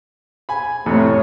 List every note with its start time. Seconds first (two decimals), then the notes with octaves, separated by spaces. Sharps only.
0.49 G#5 B5
0.86 F2 A2 C3 A3 C#5